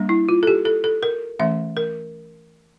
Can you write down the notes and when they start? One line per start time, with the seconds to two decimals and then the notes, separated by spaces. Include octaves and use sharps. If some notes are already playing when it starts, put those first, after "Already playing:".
Already playing: G3 A#3 D4
0.09 E4
0.29 F4
0.43 A4
0.47 G4
0.65 A4
0.84 A4
1.03 A#4
1.39 E3 A3 C#4 E5
1.77 A#4